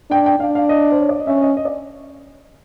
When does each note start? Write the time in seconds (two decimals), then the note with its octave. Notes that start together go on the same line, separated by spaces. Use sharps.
0.10 D4 G5
0.26 G5
0.40 D4 F5
0.55 F5
0.69 D#5
0.92 C5
1.00 C#5
1.09 D5
1.19 D#5
1.27 C#4 E5
1.42 D#5
1.57 D#5
1.65 D5